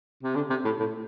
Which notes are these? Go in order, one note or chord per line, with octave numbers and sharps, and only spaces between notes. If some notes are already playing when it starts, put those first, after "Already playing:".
C3
D3
C3
A2
A2